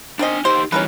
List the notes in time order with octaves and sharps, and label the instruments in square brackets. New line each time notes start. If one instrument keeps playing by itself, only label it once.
[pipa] D#3 C4 D#5 [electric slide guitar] D4 G#5
[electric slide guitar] D#4 G4 D#5 [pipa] C5
[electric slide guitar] E3 G3 D#4 [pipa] C#4 A#4 B4